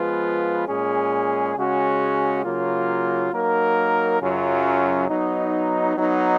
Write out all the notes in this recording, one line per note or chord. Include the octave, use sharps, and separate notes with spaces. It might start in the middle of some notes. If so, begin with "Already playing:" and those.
Already playing: F3 G#3 B3 F4 B4
A#2 G#3 C#4 G#4
C#3 G#3 C#4 F#4
C#3 F#3 A#3 F4
F#3 A#3 D#4 A#4
F#2 C#3 F#3 C#4 F4
F#3 B3 D#4
F#3 B3 D#4